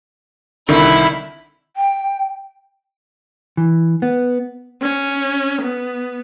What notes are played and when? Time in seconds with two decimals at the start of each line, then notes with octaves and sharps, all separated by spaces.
0.69 C2 D3 D#3 E4 B5
1.77 G5
3.57 E3
4.02 B3
4.81 C#4
5.62 B3